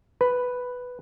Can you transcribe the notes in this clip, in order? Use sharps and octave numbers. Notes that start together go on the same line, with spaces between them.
B4